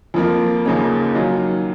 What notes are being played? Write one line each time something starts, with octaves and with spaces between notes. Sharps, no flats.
F2 F3 A#3
D#2 C#3 F3 A#3 C#4
D#3 F#3 C#4 F4